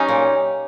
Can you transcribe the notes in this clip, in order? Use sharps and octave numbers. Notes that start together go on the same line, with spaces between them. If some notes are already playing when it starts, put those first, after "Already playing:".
Already playing: F#3 C#4 D#4 G4
A#2